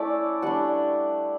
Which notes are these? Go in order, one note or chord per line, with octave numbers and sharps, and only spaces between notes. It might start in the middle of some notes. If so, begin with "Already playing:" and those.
Already playing: A3 C#4 E4 D5
G3 D4 F#5